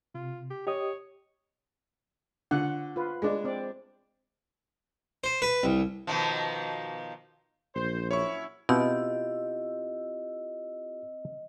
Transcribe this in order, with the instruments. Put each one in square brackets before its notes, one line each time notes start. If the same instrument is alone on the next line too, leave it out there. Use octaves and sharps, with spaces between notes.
[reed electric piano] C3 [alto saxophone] F4
[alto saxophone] G4
[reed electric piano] G4 D#5 D#6 [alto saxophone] C#5
[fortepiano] D3 [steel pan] F4 F#5
[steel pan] F4 B4
[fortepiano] G#3 D4
[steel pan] C4 D5
[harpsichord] C5
B4
C2
[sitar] B2 D#3 F3
[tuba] A#1 [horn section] C5
[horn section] F#3 C#4 E4 [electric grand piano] C#5 C#6
[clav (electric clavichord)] B2 [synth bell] C4 E6 [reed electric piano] E4 F4 G4 [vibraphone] D#5